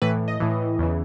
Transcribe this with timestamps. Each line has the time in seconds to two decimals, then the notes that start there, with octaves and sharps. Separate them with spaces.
0.02 A2 E3 B4
0.28 D#5
0.40 A2 E3
0.79 E2 C#3 E3